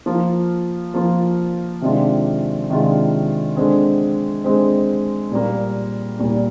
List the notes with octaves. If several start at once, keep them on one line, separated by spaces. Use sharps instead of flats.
F3 A#3 F4
F3 A#3 F4
C3 D#3 G#3 D4 F4
C3 D#3 G#3 D4 F4
D3 G#3 C4
D3 G#3 C4
A#2 G3 A#3
A#2 G3 A#3